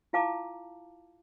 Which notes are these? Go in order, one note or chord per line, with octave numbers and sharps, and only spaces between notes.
E4 F4 F5 A5 A#5 D6